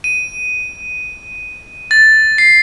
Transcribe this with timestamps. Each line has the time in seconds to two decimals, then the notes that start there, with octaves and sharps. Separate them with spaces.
0.04 D#7
1.91 A6
2.38 C7